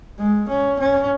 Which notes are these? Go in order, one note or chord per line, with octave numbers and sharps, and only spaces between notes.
G#3
C#4
C#4